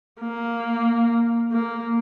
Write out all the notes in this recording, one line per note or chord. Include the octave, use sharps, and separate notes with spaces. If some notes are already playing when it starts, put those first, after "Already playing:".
A#3
A#3